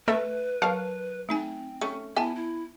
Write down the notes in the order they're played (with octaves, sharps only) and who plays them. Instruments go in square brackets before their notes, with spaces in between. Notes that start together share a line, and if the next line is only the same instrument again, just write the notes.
[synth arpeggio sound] A3 [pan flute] B4 [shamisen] E5
[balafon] F#3 [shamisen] A#4 A5 [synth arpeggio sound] F5
[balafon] A3 D#4 G#5 [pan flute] C4
[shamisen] A3 C#4 [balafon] C#6
[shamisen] B3 G#5 [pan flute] E4 [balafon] E5 A5
[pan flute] E4